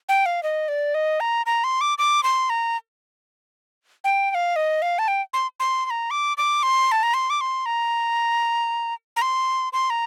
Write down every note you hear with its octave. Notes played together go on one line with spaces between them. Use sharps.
G5
F5
D#5
D5
D#5
A#5
A#5
C6
D6
D6
C6
A#5
G5
G5
F5
D#5
F5
A5
G5
C6
C6
C6
A#5
D6
D6
C6
A5
A#5
C6
D6
C6
A#5
A#5
C6
C6
A#5